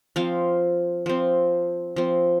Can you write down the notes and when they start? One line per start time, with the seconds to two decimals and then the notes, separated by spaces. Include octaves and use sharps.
0.16 F3 C4 F5
1.06 F3 C4
1.96 F3 C4